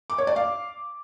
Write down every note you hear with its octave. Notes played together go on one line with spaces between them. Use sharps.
D6
C#5
D5
F5